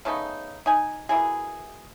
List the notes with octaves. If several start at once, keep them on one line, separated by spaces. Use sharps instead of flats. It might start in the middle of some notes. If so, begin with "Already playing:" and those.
C#3 A3 B3 D#4
D#4 G#5
B2 A#3 E4 G#4